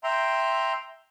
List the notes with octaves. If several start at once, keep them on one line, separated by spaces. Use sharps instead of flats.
E5 G5 A#5 C6